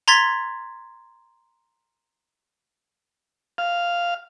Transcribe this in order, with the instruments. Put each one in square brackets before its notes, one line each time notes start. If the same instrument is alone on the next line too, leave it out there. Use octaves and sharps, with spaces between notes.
[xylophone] A#5 C6 G#6 A6 B6
[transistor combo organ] F5